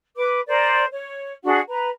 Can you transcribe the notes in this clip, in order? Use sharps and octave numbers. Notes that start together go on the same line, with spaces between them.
B4 D6
A#4 C5 D5
C#5
D4 F#4 G#4 F#5
B4 A#5